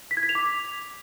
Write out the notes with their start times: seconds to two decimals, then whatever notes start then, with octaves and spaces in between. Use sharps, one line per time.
0.11 B6
0.17 G#6
0.23 B6
0.29 F7
0.35 D6